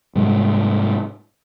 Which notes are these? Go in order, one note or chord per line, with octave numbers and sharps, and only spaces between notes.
G#2 C3 G3 G#3